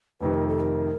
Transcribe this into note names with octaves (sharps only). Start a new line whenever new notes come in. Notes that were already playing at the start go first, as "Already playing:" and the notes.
F1 F2 C3 D#3 B4
A#4
A4
A#4